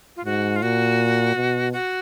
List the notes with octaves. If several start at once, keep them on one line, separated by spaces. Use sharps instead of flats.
F4
G#2 F#4
F4
A#2 F#4
B2
F#4